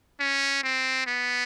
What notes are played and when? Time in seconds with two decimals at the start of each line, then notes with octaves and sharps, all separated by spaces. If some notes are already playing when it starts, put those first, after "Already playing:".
0.20 C#4
0.63 C4
1.06 B3